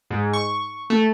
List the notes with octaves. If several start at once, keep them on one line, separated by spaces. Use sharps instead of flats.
G#2
C#6
A3